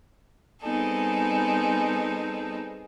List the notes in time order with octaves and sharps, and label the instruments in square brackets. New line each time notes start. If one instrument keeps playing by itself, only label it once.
[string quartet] G3 B3 C4 D#4 G#4 A4